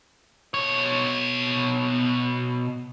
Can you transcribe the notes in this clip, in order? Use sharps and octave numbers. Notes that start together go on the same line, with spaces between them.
B2 C#5